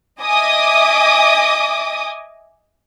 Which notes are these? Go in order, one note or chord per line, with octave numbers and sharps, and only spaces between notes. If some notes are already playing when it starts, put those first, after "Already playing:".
D#5 E5 G#5 D6 D#6